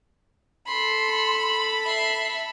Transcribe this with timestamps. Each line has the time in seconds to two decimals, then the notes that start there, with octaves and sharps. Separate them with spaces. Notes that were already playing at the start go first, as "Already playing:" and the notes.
0.67 A4 B5 C6
1.85 E5 C7